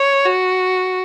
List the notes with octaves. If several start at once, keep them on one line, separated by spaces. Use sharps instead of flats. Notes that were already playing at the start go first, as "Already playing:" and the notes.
Already playing: C#5
F#4